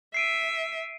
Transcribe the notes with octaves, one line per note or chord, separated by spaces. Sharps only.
E5 C7 D7 D#7